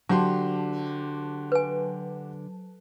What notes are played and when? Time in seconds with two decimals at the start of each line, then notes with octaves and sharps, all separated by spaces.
0.09 D3 F#3 F#4 G4 A5 C6
1.52 B4 G#5